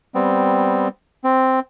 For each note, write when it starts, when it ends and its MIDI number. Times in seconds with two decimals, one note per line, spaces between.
0.15 0.88 55
0.15 0.88 59
0.15 0.88 60
1.24 1.60 60